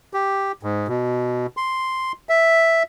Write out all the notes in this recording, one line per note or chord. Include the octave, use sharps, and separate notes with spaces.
G4
G#2
B2
C6
E5